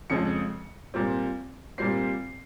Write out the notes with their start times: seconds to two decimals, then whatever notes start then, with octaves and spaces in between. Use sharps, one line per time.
0.10 F2 C#3 F3 G#3 C#7
0.94 A#2 G3 C4
1.78 A#2 G3 C4 C7